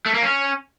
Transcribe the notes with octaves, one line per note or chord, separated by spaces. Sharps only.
A3
A#3
C#4